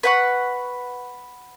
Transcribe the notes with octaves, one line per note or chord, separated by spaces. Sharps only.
B4 F#5 C#6